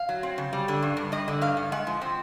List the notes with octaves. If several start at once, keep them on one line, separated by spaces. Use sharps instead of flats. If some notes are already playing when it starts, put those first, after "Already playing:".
Already playing: F5
F#3
C4
C#3
G3
D3
G2
G2
G3 D#5
D3
G2 F5
G2
G#3 F#5
F3
C4